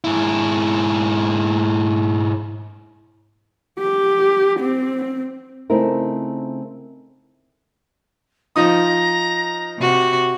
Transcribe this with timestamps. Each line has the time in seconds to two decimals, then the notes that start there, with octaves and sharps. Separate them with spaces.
0.04 G#2 E4
3.78 G4
4.59 C4
5.70 C#3 A3 C4 D#4 E4 A#4
8.56 F3 D#4 A#5 D#6
9.79 C3 F#4